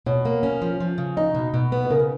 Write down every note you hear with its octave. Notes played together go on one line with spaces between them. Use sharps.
B2 C#5
A#3
C#4
F3
F3
C#3
D#4 D#5
B2
B2
B3 B4
B4
C#3 A#4